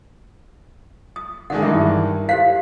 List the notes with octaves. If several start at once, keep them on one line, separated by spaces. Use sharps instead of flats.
D#6
D3 D#3 G#3 F#5
G2 D#3 E3 E5
G4 C5 F5 B6